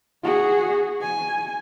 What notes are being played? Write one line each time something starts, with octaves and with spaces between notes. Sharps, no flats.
F#4 G#4
G#5